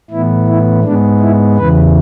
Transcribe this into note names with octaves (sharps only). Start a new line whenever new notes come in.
A2 E3 B3 E4
E4
G#2 G#3 B3 D4
E4
E2 C#3 E3 B4